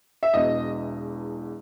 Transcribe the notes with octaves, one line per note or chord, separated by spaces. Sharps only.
E5
E1 E2 B2 D#5